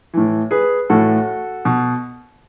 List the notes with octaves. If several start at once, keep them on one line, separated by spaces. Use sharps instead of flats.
A2 E3
G#4 B4
A2 E3 F#4 A4
B2